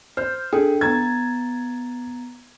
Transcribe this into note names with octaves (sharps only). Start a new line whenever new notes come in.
C5 F6 G6
D4 G#4 A4 G5
B3 A#5 G#6 A6